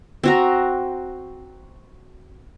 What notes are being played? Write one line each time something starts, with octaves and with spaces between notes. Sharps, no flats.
C4 F#4 A#5